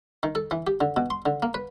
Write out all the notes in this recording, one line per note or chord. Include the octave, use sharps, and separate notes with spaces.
D#3
A4
E3
G4
D3
B2
C6
D3
A#3
B4